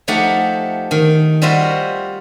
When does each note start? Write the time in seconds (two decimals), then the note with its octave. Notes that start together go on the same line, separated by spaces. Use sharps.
0.08 F3 A3 D#4 G4 F#5
0.91 D#3
1.42 G3 F4 F#4 C5 D#5 E5